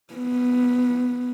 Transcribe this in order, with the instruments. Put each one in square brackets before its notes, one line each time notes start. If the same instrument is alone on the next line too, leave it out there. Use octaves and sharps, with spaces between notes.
[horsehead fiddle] B3